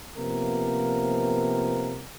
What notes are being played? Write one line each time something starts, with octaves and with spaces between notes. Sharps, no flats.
C3 F3 A#3 B3 A#4